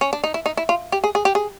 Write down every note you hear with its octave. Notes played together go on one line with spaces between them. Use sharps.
C#4
D4
D#4
E4
D#4
E4
F4
G4
G#4
G#4
G4
G#4